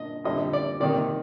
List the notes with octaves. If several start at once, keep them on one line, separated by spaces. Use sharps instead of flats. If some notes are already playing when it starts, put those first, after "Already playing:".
Already playing: A#2 D4 D#5
F2 D3 G3 D#5
D5
C3 D#3 A#3 D#4 D5